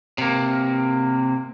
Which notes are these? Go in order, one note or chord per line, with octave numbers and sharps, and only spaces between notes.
C3 A#3